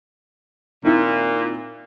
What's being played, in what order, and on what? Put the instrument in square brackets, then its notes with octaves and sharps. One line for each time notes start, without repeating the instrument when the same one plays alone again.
[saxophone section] A#2 [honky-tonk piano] D#3 C4 E4